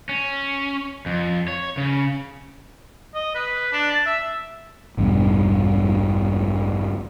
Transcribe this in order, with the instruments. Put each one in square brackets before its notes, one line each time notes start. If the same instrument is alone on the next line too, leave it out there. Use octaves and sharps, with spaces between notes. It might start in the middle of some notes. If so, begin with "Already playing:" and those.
[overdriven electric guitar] C#4
F2
C#5
C#3
[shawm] D#5
B4
D4
A5
E5
[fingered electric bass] A1 E2 G2 B2